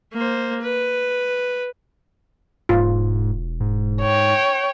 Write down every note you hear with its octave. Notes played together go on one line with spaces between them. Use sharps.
A#3 C5
B4
E1 G#2 F4
G#2
C#5 G5